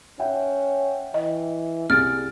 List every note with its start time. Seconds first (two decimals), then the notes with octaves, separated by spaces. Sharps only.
0.19 C#4 E5 F#5 G5
1.14 E3 D#5
1.90 C2 G#4 F6 A6 D7